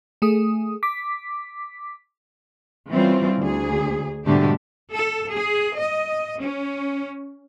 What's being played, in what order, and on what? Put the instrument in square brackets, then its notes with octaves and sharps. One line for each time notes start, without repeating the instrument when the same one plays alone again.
[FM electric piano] A3 G#4 D#6
D6 B6
[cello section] E3 G3 C4 C#4 F4
D2 G#4
G#2 B2 D3 G3 A3 G4
A4
G#4
D#5
C#4